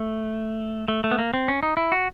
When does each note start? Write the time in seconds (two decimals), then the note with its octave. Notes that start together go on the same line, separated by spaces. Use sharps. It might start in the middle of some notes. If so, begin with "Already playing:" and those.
Already playing: A3
0.88 A3
1.04 A3
1.11 B3
1.19 A#3
1.34 C4
1.48 C#4
1.63 D#4
1.77 E4
1.92 F#4